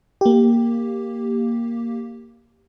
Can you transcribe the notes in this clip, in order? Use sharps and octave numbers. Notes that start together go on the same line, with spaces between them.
A#3 G4